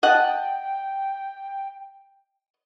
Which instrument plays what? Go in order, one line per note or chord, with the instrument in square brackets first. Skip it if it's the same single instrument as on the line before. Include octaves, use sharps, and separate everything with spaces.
[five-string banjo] D#5 F#5 A5 [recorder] G5